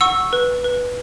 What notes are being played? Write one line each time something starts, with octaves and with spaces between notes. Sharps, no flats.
F#5 C#6 E6
B4
B4